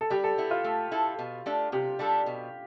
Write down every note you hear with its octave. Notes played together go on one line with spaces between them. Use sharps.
A4
G3 G4
A4
B3 E4
F4
A3
E4 A4
B2
A3 D4 G4
C3 G4
G3 D4 A4
B2